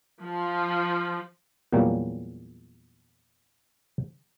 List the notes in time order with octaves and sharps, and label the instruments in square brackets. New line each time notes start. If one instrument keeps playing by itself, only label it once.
[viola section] F3
[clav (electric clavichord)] E2 A#2 F#3 G3 A#3 C#4